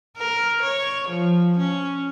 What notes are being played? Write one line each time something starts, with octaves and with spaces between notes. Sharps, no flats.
A#4
C#5
F3
C#4